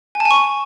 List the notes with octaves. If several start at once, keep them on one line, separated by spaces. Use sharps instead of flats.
G#5
A5
G#5
C#6